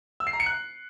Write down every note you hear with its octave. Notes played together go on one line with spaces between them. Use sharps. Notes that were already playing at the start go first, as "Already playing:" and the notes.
E6
C7
A#5
C#7
F#6